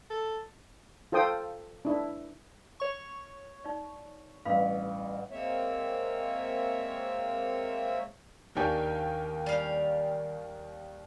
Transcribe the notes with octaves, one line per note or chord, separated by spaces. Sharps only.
A4
F4 A4 C5 G5 D#6
D4 E4
C#5 C#6
D#4 D5
A1 G2 F5 B5
G#3 A#3 C4 C#5 E5
D#2 D#3 D4 G4 A#4 C#5 G5 G#5
G3 F5